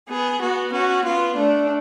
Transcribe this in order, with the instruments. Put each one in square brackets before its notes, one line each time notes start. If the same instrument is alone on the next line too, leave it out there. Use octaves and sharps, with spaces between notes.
[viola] B3 [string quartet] G#4
[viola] B3 [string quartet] F#4
[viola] C#4 [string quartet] F#4
[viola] B3 [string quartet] F4
[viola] A3 [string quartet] D4